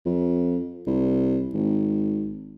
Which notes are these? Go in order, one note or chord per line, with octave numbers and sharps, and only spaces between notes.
F2
C2
G#1